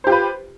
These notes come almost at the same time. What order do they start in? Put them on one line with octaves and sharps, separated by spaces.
C5 G4 F4 B4